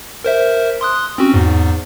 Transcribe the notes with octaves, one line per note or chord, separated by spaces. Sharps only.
A#4 C5 E5
C6 D#6 F#6
C4 C#4 F#4
E2 G#2